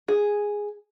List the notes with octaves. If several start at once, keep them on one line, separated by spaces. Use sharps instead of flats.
G#4